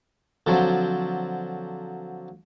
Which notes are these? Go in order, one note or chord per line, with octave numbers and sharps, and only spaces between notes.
D3 F3 F#3 C4